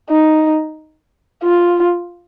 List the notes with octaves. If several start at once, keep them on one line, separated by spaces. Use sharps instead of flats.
D#4
F4